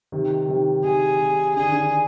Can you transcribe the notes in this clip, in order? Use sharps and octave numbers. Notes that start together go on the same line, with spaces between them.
C3 D#3
C3 D#3
C3 D#3 G#4
C3
D3 G#4
D#3
D3